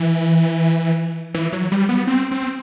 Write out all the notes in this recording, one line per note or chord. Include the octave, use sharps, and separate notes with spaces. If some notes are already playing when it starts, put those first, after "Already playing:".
Already playing: E3
E3
F#3
G3
B3
C4
C4